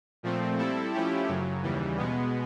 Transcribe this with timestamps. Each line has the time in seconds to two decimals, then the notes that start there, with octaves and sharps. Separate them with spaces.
0.23 A#2 F3 A3 C4
0.58 G3 C4 E4 A4
0.93 F3 A3 C#4 E4 G4
1.28 F#2 C#3 F#3
1.63 D#2 C#3 E3 G3
1.97 B2 G#3 B3